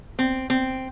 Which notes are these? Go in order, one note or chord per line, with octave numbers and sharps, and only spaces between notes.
C4
C4